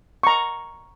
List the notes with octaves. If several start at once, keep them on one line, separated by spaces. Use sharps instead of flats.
A#5 C#6